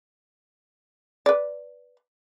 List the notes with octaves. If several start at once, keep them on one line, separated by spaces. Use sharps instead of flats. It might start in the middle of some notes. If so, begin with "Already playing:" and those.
B4 D5